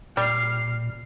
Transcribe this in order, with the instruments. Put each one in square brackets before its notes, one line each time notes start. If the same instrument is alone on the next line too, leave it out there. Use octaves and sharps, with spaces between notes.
[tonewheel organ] A#2 [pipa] G3 [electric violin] F6 C7